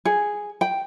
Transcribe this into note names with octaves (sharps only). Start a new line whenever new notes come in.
G#4
G5